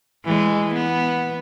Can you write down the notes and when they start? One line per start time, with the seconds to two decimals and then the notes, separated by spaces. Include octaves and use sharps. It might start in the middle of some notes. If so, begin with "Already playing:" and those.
0.25 E3 G#3
0.73 B3